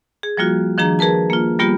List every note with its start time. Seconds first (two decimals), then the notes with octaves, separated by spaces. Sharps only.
0.23 G#4
0.37 F3 G3 A#3 F4 F#4
0.78 D#3 F3 D4 G#4 A#5
0.99 G#4 A#4 B4 A5
1.30 A#3 F4
1.59 G3 A#3 B3 F4 G4